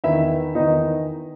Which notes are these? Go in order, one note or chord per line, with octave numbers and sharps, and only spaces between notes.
E2 D#3 E4 E5
E2 D#3 D#4 D#5